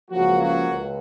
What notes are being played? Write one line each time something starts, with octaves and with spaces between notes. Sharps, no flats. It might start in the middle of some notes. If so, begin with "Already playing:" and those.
C#2 C#3 F3 F#3 A#3 F#4
F#3 F#4
C#2